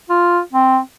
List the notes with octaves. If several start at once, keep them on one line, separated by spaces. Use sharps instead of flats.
F4
C4